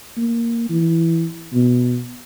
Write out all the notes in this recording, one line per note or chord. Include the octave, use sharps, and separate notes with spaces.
A#3
E3
B2